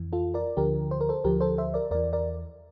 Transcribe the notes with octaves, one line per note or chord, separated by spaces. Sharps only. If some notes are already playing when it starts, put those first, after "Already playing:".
Already playing: F2 E3
F4 A4
A#4 D5
D2 D3 F3 G4 A#4
C5
A#4
A4 C5
D2 D3 F3 G4 A#4
A4 C5
C5 E5
A#4 D5
E2 E3 A#4 D5
A#4 D5